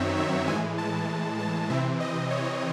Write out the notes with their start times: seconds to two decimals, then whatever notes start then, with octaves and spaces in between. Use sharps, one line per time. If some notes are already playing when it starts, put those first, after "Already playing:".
Already playing: F#2 D#3 F#3 C4 D#4 C#5 E5
0.17 E5
0.47 A2 E3 G#3 G#5
0.78 A5
1.39 A5
1.70 C3 E3 C4 E5
2.00 D#5
2.31 C#5